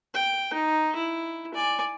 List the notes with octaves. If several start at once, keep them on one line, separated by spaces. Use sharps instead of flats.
G5
D#4
E4
D5 G#5